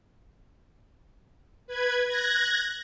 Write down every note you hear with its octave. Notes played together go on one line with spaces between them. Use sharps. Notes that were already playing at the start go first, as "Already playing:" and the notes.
B4 G#6
F#6 G#6 A#6